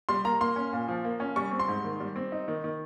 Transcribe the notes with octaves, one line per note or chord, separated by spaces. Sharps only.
G3 C6
A#3 A#5
A#3 C6
C#4
A#2
F3
A#3
C#4
G3 C#6
C4
C6
G#2
D#3
G3
C4
D#4
D#3
D#3